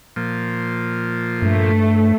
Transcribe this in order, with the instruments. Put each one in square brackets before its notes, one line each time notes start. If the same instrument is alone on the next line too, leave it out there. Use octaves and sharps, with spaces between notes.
[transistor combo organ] A#2 F3
[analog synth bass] G2 [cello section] A3